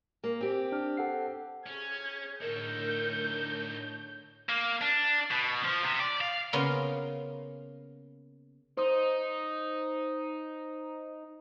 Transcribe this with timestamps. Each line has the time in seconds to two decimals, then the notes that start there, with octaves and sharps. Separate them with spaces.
0.24 A#3
0.41 C4 G4
0.72 D4 F6
0.97 A4 F#5 C7
1.66 C#4 G#4 G#6
2.42 A2 D3 D#4 A4 A#4 C#5 G6
4.49 A#3
4.81 D4
5.31 B2
5.64 F3
5.83 C3
6.00 D5
6.21 F5
6.53 C#3 A#3 B3 C#4 F5 C6
8.77 D#4 C5 D#6